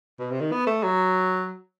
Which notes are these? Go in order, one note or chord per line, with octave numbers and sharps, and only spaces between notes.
B2
C3
D#3
B3
A3
F#3